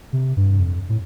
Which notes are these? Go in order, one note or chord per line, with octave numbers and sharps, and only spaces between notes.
C3
G2
F2
A2